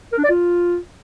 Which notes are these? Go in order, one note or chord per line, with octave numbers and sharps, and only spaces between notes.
A#4
D4
D5
F4